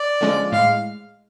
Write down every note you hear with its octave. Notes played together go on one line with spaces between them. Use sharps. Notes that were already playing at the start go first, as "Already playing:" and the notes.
Already playing: D5
D3 F3 G#3 C#4 F4
A2 G#3 F5